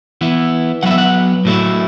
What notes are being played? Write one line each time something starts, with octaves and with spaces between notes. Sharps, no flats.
E3 B3 E4
F#3 B3 E4 F#5
E5
F#5
A2 F#3 A3 E4